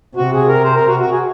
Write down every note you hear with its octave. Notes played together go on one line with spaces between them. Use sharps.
C3 F#4
G#4
A#4
C5
A#4
F#4
F#4
G#4